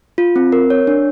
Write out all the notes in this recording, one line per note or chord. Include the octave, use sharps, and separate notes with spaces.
F4
C4
A#4
C#5
D4